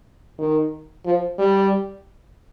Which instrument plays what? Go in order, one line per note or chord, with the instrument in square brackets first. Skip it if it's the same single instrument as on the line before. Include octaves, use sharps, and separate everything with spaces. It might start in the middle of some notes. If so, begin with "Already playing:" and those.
[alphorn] D#3
F3
G3